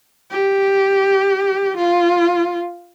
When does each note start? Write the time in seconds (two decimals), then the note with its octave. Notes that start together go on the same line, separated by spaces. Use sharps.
0.31 G4
1.77 F4